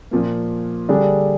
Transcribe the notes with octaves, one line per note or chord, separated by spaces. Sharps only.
A#2 F3 A#3
D3 G3 D4 G#4